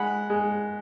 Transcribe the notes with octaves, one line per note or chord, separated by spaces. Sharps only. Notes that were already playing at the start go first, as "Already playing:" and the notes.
Already playing: G#3 F#5 B5
G#3